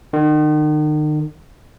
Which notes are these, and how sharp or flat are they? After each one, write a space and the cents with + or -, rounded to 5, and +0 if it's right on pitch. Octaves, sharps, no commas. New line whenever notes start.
D#3 -40